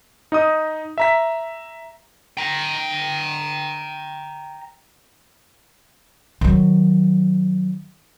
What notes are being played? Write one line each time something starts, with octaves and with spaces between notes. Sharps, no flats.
D#4 D#5 D#6
E5 A#5 B6
G5 A#5
D#3 F#3